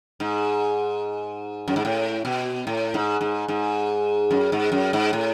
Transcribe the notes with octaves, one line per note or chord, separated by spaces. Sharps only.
G#2
F#2
G#2
A2
B2
A2
G#2
G#2
G#2
F#2
G#2
F#2
G#2
A2